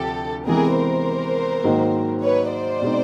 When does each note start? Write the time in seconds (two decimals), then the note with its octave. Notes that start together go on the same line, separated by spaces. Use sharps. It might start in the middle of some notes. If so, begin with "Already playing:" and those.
Already playing: D2 C3 F3 G4 A4
0.47 C3 E3 G#3 B3 G#4 A#4
0.76 A#4 C5
1.64 G#2 D#3 F#3 A#3
2.22 B4 C#5
2.52 C5 D5
2.82 B2 G#3 C4 D#4